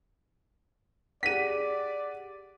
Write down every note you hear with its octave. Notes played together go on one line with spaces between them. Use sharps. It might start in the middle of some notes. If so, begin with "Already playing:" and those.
G4 G#4 D5 F#5 B6 D#7